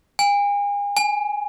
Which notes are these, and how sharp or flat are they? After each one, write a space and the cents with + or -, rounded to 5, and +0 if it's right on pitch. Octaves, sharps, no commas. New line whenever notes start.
G#5 -40
G#5 +10